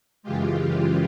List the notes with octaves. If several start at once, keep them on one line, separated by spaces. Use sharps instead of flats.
F#2 C#3 E3 G#3 F4 G4